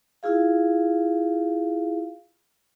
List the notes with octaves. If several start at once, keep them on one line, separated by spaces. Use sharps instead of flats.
E4 F4 G#4 F5